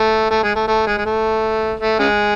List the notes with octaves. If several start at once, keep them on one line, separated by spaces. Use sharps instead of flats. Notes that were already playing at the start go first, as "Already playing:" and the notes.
Already playing: A3
A3
G#3
A3
A3
G#3
G#3
A3
A3
C#3 G#3